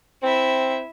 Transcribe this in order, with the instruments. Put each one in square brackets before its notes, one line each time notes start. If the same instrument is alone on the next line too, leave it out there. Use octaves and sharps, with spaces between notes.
[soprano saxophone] C4 [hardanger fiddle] E4 E5